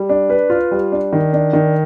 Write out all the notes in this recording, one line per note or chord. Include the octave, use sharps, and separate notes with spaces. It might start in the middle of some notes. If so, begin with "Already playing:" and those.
Already playing: G3
D4
B4
F4
G3
D4
D#3
D4
D#3